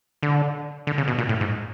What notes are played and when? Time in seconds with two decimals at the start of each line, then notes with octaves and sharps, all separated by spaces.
0.23 D3
0.87 D3
0.98 C#3
1.08 B2
1.18 A#2
1.29 A2
1.41 G#2